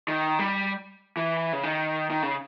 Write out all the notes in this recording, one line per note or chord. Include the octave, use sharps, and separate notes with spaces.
D#3
G3
E3
C#3
D#3
D#3
C#3